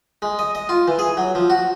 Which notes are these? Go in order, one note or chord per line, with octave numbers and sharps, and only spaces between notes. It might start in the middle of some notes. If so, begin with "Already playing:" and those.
G#3
D#5
D#5
F4
E3
G#4
F#3
F3
F#4